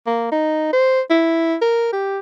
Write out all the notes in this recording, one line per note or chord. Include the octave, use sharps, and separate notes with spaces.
A#3
D#4
C5
E4
A#4
G4